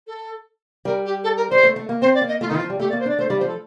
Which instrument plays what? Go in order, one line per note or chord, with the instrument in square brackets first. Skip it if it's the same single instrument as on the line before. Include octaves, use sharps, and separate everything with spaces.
[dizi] A4
[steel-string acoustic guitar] G3 [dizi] A#4
[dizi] G4
A4
A#4
[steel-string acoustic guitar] G3 [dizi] C5
[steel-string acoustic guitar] A3
A3
A#3
[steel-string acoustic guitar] C4 [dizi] C5
[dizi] D5
[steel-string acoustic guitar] A#3
[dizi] D#5
[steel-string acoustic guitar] A3 [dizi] F4
[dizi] D#4
[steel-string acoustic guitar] D#3
[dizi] F4
[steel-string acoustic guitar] F3
G3
[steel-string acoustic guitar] A3 [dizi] G4
[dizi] D5
[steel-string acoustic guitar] A#3
[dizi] C5
[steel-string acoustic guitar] D4 [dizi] D5
[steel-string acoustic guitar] A3 [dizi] C5
[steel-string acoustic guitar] G3 [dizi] D5
[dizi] C5
[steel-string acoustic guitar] F3
[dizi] A4